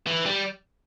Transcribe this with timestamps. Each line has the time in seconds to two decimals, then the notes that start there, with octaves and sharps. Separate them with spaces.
0.07 E3
0.26 G3